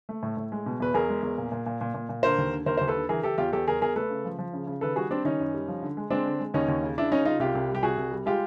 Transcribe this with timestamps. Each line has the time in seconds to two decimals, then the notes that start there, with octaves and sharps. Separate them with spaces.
0.09 A3
0.23 A2
0.37 A2
0.52 G#3
0.66 B2
0.80 E2 B4
0.94 E2 G#4 A#4
1.09 G#3
1.23 E2
1.38 A#2
1.52 A#2
1.66 A#2
1.81 A#2
1.94 A#2
2.09 A#2
2.23 D3 A#4 C5
2.38 D#2
2.52 D3
2.66 D#2 A#4 C5
2.77 D#2 C5
2.88 A4 B4
2.95 D3
3.09 E3 G#4 A#4
3.23 E3 G4 A4
3.38 E2 F4 G4
3.53 E2 G4 A4
3.68 E2 G#4 A#4
3.81 E2 G#4 A#4
3.96 A3 A4 B4
4.10 C#3
4.25 F3
4.38 F3
4.53 C#3
4.67 C#3
4.81 D#3 A4 B4
4.96 G3 F#4 G#4
5.10 G3 C4 D4
5.24 D#3 C#4 D#4
5.40 F#2
5.54 G3
5.68 F3
5.82 D3
5.97 G#3
6.11 G#3 C4 D4
6.26 D3
6.40 G#3
6.54 D#2 C#4 D#4
6.68 D#2
6.82 C#3
6.98 C#3 D4 E4
7.12 C#3 C#4 D#4
7.25 C#3 D#4 F4
7.40 C2 F4 G4
7.55 C2
7.69 G3
7.75 G4
7.83 C2 F#4 G#4
7.97 C2
8.12 G3
8.26 G#3 F4 G4